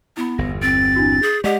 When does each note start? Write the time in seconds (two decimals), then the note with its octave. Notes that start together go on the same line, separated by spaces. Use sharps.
0.17 B3 E4 B5
0.38 G1 E2 A#6
0.62 C4 A6 D7
0.96 D4 E4 F#4
1.22 G#4 G6
1.44 G#3 G4 D5 D#5 F#5